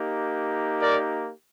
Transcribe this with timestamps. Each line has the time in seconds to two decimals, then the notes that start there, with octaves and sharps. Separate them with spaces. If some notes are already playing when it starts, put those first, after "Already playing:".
Already playing: A#3 D#4 G4
0.79 A#4 D5